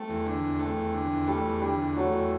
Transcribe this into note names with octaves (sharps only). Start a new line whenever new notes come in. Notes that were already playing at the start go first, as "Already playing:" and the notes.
Already playing: A3 C4
E2
D3
E2
A3 C4
E2
D3
E2
G3 A3 G4
E2
D3 G3 G4
E2
F#3 A3 F#4
E2